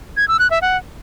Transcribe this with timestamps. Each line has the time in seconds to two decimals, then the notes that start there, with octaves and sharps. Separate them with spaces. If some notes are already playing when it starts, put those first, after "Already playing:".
0.17 G#6
0.28 E6
0.39 F#6
0.50 E5
0.62 F#5